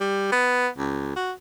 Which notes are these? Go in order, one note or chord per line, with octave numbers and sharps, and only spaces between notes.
G3
B3
C#2
F#4